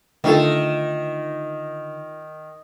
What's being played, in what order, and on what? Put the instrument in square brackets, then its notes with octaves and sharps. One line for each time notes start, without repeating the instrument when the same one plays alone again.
[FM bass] D3 [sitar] D#3 [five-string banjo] A3 F4 A4